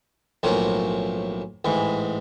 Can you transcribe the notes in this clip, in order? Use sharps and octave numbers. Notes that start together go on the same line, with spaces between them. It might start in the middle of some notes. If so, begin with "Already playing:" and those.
B1 A2 F3 A#3 C#4
A1 G#2 E3